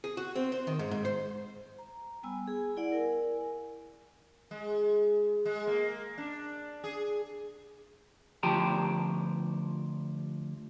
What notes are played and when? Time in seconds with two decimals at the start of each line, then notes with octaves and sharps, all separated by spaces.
0.04 G#4
0.17 F#4
0.36 C4
0.52 C5
0.67 D#3
0.79 G#2
0.91 G#2
1.05 C5
1.79 A#5
2.23 G3 B3 G#5 E6
2.48 G#4
2.77 E4 D5 F#5 E6
2.92 A#4 G#5
4.51 G#3
5.45 G#3
5.67 A#3
6.18 D4
6.84 G#4
8.43 D2 F3 G4 G5 A5 A#5